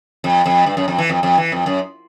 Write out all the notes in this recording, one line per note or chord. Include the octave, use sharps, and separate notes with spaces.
F2
F2
G2
F#2
F2
E3
F2
F2
E3
F2
F#2